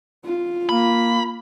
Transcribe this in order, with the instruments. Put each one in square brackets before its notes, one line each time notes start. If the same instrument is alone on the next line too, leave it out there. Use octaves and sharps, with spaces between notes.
[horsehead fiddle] F4
[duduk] A#3 [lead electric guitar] B5